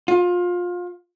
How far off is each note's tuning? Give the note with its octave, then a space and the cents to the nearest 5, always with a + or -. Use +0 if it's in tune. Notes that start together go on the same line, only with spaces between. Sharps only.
F4 +25